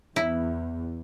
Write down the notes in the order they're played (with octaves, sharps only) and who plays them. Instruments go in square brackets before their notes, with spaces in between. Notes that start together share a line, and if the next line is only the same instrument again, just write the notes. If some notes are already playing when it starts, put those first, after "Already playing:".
[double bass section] E2 [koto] E4